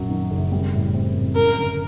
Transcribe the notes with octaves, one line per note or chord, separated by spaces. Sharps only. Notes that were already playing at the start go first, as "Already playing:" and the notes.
Already playing: A#1 F#2 F#3
D#3
F#1
G3
A2
C4
A2
F#2 A#4
G1